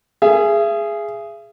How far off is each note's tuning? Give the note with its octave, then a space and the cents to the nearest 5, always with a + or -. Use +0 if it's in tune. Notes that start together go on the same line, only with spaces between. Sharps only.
G#4 +0 E5 +40